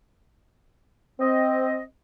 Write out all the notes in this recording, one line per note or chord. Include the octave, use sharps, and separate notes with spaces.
C4 D#5